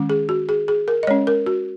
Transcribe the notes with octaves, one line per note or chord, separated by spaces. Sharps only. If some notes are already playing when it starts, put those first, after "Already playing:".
Already playing: D#3 G#3 C#4
G#4
F#4
G#4
G#4
A#4
D#5
G#3 C#4 C#5
A#4
F#4